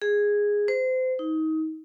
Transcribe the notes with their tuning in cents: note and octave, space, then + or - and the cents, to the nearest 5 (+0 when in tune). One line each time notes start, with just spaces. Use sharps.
G#4 -5
C5 -30
D#4 +25